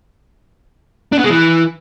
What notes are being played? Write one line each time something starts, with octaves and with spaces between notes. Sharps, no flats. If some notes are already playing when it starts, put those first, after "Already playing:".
D4
B3
G#3
E3